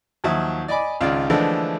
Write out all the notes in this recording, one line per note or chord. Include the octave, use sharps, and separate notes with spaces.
D#2 F3 F#3 E5 D#6
D5 D#5 G#5 B5 D6
G#1 C#2 F4 D5
D3 E3 F3 G#3 A3 D4